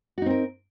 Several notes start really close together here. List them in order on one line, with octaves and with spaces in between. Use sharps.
F#4 D#4 C4 A#4